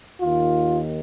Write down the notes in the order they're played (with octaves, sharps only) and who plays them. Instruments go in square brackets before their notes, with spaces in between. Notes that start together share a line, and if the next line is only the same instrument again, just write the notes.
[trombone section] D#2 D#3 F4